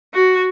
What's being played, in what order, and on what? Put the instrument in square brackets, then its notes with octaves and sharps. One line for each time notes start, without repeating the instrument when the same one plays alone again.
[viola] F#4